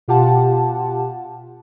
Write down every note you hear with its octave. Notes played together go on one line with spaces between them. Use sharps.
B2 F4 G4 F#5 A5